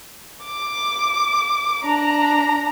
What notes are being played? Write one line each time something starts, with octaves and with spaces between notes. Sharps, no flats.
D6
D4 A#5